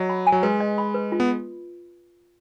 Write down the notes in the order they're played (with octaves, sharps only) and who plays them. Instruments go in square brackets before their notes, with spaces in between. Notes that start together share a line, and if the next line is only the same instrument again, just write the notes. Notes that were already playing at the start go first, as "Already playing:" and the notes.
Already playing: [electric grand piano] F#3 [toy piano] D#5
[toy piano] B5
G#5
[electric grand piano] F#3
[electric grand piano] G#3 [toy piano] B4
[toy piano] D#5
B5
B4
F4
[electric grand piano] B3